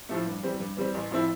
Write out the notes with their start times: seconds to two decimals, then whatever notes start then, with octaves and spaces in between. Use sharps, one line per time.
0.09 A2 F3 A3
0.26 G2
0.43 E3 G3 C4
0.60 G2
0.77 E3 G3 C4
0.94 A1
1.11 A2 F3 C4 E4